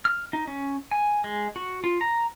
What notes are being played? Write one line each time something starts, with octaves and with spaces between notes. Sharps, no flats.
F6
D#4
C#4
G#5
G#3
F#4
F4
A#5